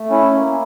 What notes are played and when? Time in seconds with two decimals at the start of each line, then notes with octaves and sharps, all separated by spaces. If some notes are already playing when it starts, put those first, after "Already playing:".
Already playing: A3
0.10 C#4 E4
0.35 A#3